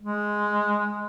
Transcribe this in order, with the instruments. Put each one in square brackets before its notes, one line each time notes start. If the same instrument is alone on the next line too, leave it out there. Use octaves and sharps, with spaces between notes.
[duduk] G#3